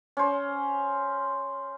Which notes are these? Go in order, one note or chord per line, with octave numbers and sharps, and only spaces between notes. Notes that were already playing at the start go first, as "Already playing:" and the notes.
C#4 C5